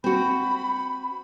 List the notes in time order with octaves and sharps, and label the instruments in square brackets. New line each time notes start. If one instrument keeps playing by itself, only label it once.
[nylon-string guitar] C4 F#4 [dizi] B5